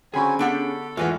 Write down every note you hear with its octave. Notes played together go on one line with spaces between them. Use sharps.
D3 F#3 C4 C#4 G#4 G#5 B5 C#6
B3 D4 G4 A4 F#5
E2 G#2 E3 G#3 A3 B3 F4